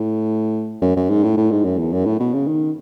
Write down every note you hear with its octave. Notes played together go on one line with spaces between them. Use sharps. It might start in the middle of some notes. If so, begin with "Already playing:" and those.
Already playing: A2
F#2
F#2
G#2
A2
A2
G#2
F#2
E2
F#2
A2
B2
C#3
D#3